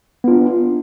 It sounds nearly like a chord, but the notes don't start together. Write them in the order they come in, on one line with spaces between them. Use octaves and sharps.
B3 F4 D4